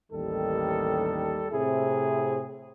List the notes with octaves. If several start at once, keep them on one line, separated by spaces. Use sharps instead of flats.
A1 D#2 D#3 G3 A4
A2 C3 C4 E4 G#4